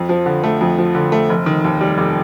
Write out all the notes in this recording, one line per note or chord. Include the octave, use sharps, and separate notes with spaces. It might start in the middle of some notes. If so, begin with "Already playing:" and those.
Already playing: F2
F3
D3
A3
F2
F3
D3
A3
F1
D#3
D#2
G3
F1